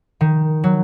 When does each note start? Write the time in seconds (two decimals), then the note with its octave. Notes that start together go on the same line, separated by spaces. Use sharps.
0.21 D#3
0.64 F#3